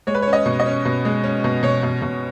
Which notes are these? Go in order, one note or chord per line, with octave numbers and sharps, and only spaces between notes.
G#3 C#5
B4
C#5
C#4
D#5
B2
D#5
C#4
B2
G#3
C#4
B2
B2 C#5
B2
B2